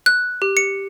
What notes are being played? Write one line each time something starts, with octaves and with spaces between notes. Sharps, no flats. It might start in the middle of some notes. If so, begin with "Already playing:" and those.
F#6
G4
C#7